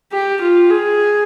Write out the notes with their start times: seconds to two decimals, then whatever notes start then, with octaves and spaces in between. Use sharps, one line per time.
0.13 G4
0.41 F4
0.70 G#4